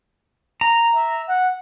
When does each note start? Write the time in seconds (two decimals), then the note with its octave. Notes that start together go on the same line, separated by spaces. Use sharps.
0.61 A#5
0.95 E5
1.28 F#5